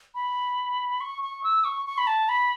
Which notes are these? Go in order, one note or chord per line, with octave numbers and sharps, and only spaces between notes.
B5
C#6
C#6
E6
C#6
C#6
B5
A5
B5